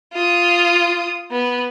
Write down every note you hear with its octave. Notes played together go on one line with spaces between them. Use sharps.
F4 D#6
B3